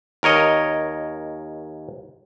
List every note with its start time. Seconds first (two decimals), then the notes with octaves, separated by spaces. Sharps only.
0.23 D#2 A#4 C#5 D#5